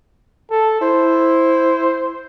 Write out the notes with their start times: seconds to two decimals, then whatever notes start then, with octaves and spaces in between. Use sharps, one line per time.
0.51 A4
0.81 E4 C5